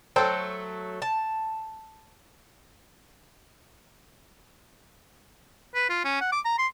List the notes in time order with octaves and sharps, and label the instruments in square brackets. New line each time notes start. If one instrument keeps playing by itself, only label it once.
[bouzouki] F#3 A3 [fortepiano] A4 C5 G5
[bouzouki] A5
[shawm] B4
F4
C#4
F#5
D6
A#5
C6